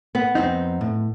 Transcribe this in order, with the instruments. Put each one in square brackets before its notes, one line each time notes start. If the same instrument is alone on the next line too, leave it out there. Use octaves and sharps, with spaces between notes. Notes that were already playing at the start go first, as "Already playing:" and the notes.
[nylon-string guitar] B3
[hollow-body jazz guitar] F2 C4 D#4
A2